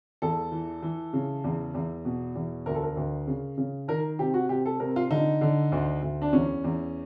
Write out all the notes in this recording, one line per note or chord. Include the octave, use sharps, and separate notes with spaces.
E2 A4
E3
E3
C#3
E2
E2
B2
E2
D2 A#4
A4
A#4
D2
C#3
C#3
D#3 A#4
C3 G4
F#4
C3 G4
A4
C3 A#4
F4
D3 D#4
D3
D2
D2
D4
E2 C#4
E2